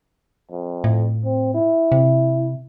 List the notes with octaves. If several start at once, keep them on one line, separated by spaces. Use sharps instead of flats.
F2
A2
C4
E4
C3